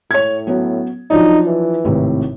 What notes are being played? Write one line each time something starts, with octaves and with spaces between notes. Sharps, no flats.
A2 C#5 G#6
F#3 B3 C#4
F3 F#3 D4 D#4
E3
G#1 A2 C3